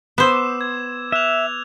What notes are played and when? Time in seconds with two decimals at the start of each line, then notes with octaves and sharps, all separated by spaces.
0.18 B3 C5 E6 E7
0.32 D6
0.61 G#6
1.12 E5 F6 F#6 F7